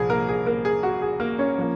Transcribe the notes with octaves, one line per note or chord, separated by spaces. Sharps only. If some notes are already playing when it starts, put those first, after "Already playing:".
Already playing: C2 A#2 F3 G#4
A#3 A#4
G#4
A#3 A#4
G#4
F#4
G#4
A#3 A#4
C#4 C#5
F3 A#3